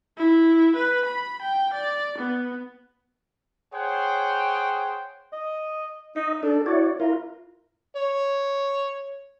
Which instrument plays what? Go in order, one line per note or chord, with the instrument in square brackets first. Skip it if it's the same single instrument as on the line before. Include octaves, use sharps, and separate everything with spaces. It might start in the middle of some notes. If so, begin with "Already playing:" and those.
[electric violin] E4
B4
B5
G5
D5
B3
[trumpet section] G#4 C5 C#5 F#5 G5
[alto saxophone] D#5
[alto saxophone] D#4 [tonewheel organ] D#5
[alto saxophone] D4 [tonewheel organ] A4
[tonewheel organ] E4 C#5 D5 [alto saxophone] F#4
[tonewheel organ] E4 A#4 [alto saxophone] F4
[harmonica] C#5